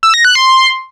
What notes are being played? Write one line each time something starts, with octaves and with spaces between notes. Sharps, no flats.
E6
A#6
F#6
C6